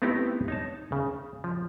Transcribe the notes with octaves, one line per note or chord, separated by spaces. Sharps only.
A3 B3 C4 D#4 E4 G4
D#4 C#5 A5
C#3
F3